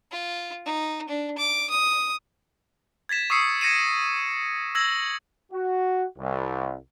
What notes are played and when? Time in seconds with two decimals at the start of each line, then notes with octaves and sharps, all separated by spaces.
0.12 F4
0.66 D#4
1.08 D4
1.38 D6
1.70 D#6
3.09 G#6 A6 B6 E7
3.30 C#6 D#6 E6 C7 C#7
3.61 G#6 A#6 C#7 D#7 E7
4.75 E6 G#6 A#6 F#7
5.52 F#4
6.17 C2